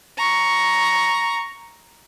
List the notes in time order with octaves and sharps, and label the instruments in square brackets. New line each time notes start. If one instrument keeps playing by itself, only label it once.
[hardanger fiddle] A#5 C#6